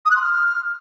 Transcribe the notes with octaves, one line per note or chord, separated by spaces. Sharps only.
D#6
F#6
C6
F6